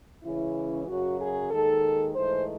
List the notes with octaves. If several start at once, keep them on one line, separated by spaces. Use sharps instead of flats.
C#3 E3 G#3 C#4 E4
F#2 C#3 F#3 F#4
G#4
D#2 D#3 G#3 A4
G#2 E3 A3 D#4 C5